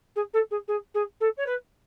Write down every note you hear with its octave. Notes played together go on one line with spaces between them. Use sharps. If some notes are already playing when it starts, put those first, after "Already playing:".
G#4
A4
G#4
G#4
G#4
A4
C#5
B4